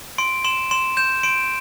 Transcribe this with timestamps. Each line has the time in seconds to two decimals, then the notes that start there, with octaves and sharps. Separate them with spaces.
0.18 C6 D7
0.45 C6 E7
0.71 C6 E7
0.97 G6 E7
1.23 C6 D7